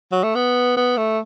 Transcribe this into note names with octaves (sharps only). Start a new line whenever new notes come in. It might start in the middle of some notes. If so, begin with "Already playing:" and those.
F#3
A3
B3
B3
A3